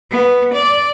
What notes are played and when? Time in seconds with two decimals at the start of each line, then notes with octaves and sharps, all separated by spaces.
0.11 B3
0.53 D5